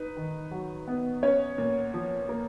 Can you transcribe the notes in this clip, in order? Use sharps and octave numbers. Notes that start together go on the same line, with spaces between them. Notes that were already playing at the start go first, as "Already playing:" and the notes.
Already playing: D#4 B4
D#3
F#3
B3
C#4 C#5
A#2
F3
A#3